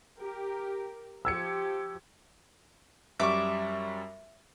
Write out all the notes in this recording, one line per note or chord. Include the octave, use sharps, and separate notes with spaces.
G4 A#4
F3 G4 E6 G#6 C#7
F#2 G3 E5 C#6 D6